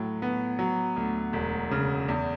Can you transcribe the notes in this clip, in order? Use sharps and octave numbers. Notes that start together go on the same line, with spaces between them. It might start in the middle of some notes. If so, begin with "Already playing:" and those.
Already playing: A2 F#3
B3
F#3
D2
E1
C#3
E2